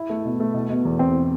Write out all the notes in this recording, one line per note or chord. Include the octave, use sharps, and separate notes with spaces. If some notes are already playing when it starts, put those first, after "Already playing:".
Already playing: E4
A3
B2
A3
B2
B2
E2
C4